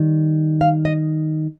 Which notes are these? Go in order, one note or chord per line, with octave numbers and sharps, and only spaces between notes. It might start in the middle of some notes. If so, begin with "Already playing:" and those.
Already playing: D#3 G3
F5
D#5